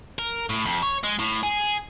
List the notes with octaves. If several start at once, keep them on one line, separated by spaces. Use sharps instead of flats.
A#4
A2
F2
C#5
G#3
A2
G#4